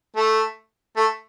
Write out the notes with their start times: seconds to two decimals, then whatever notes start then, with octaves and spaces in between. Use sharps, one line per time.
0.16 A3
0.97 A3